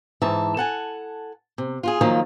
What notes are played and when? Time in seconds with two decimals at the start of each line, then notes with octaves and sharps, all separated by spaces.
0.22 G#2 E3 E5 A5
0.57 A4 F#5 G#5
1.58 C3
1.83 F4 F#4 G#4
2.01 D#3 F3 F#3 A#3 F4